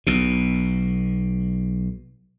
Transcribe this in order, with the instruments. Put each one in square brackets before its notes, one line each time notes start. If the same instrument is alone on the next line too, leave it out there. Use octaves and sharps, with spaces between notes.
[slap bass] B1 B2